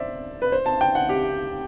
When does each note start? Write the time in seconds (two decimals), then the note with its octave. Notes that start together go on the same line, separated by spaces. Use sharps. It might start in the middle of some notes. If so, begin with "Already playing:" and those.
Already playing: C5 D5 E5
0.42 B4
0.52 C5
0.66 A5
0.81 G5
0.95 F#5
1.09 G4